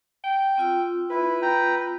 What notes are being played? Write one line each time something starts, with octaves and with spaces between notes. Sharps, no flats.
G5
C4 F4 E6
E4 B4
G5 A#5